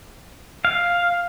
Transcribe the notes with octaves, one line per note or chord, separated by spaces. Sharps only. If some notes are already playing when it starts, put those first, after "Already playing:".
F5